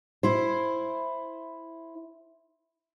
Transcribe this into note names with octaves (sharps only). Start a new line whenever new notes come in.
E4 C5